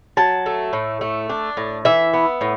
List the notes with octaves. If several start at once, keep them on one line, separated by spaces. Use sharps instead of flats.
F#3 A5
A3
A2
A3
D4
A2
E3 E5
B3
A2